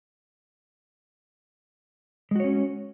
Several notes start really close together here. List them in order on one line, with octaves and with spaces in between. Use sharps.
G#3 F#4 C#5 C#4